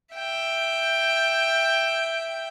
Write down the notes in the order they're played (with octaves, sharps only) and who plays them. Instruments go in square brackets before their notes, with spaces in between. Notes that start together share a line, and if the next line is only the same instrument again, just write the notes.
[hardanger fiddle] E5 G5